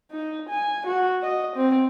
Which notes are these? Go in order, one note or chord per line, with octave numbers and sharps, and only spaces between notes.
D#4
G#5
F#4
D#5
C4